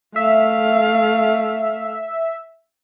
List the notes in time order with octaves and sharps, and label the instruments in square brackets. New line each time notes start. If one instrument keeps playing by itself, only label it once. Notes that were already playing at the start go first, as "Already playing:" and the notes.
[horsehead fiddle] A3 F5 [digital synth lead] E5